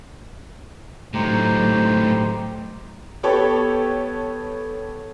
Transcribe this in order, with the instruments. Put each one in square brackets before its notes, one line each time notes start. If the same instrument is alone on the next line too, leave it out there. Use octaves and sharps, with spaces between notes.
[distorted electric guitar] A2 F#3 [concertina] D#4 G4 C5
[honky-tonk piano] B3 G4 A4 C#5